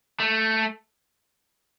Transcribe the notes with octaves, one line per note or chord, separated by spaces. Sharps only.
A3